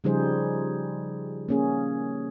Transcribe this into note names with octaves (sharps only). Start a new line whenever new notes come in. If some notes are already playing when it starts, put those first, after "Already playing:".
C#3 F3 G3 D#4 G#4 C5
A#3 C#4 G#4